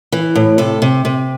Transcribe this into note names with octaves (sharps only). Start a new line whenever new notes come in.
E3
A2
C3 A4
C3
C3